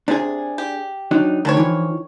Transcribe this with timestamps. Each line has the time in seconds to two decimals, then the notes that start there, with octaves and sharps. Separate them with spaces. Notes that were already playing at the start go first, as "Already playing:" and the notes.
0.08 C3 D4 G#4
0.58 G4
1.11 F#3 D4 D#4
1.45 D2 D#3 D4 C#5
1.57 E3 F3